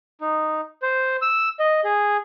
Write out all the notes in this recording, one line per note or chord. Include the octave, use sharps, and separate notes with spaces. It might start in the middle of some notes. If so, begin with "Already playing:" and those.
D#4
C5
E6
D#5
G#4